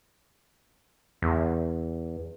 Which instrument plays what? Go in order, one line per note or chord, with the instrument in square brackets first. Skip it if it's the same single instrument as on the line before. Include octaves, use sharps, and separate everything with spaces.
[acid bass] E2